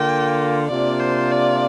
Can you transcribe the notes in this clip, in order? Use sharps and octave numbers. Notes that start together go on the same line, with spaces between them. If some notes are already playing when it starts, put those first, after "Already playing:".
Already playing: D3 A#3 F4 G5
C3 A#3 D4 F4 D5
C5
D5